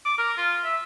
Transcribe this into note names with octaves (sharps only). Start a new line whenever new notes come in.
D6
A#4
F4
E5